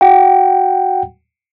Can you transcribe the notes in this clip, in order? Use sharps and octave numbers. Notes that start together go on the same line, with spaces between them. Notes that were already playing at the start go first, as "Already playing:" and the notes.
F#4 F#5 G5